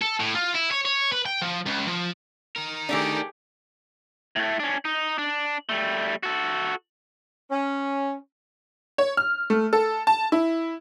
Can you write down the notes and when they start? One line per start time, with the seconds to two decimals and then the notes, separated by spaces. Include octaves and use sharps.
0.02 A4
0.20 A2
0.35 F4
0.54 E4
0.71 C#5
0.85 C#5
1.12 B4
1.26 G5
1.41 F3
1.66 C#2
1.87 F3
2.56 D#4 A#4
2.89 D#3 A3 D4 G4 G#4
4.36 A2 A3
4.60 C#4 D4
4.85 D#4
5.18 D4
5.69 G3 A3
6.23 F#4 A4
7.51 C#4
8.98 C#5
9.17 F6
9.50 A3
9.73 A4
10.07 A5
10.32 E4